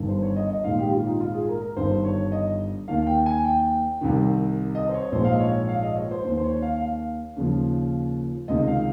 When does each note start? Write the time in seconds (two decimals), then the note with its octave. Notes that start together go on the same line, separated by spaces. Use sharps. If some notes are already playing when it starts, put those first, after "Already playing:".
Already playing: G1 G2 D#3
0.08 C5
0.23 C#5
0.36 D#5
0.50 D#5
0.64 A#1 G#2 D#3 F5
0.79 G4
0.92 F4
1.06 D#4
1.20 F4
1.35 G#4
1.48 A#4
1.62 A#4
1.76 G1 G2 D#3 C5
2.05 C#5
2.32 D#5
2.88 D#2 D#3 F5
3.07 G5
3.26 G#5
3.45 G5
4.01 C2 C3 D#3
4.75 D#5
4.89 C5
4.94 C#5
5.12 A#1 G#2 F3 C5
5.24 F5
5.32 D#5
5.40 C#5
5.68 F5
5.83 D#5
5.96 C#5
6.11 C5
6.24 D#2 D#3 C5
6.37 C5
6.44 C#5
6.62 F5
6.81 F5
7.36 D#2 C#3 F3
8.48 C#2 C3 D#3 D#5
8.68 F5